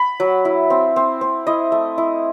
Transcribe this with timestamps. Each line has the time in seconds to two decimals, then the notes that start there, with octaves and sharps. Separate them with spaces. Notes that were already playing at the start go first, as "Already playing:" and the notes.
Already playing: B5
0.20 F#3
0.45 E4
0.70 C4
0.96 C4
1.21 C4
1.47 E4 D#5
1.72 A3
1.98 E4